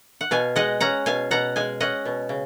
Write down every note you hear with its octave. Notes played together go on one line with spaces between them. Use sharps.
F#5
B2 F5 G#5
G#3 D#5 F#5
C#4 F#5 A#5
B2 F5 G#5
B2 F#5 A#5
G#3 F5 G#5
C#4 D#5 F#5
B2
C#3